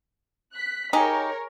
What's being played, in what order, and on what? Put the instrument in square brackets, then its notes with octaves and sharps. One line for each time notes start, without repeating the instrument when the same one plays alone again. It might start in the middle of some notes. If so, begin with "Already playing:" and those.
[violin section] F#6 B6
[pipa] D#4 G4 [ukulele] G#4 G#5 B5 [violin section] A#4 C#5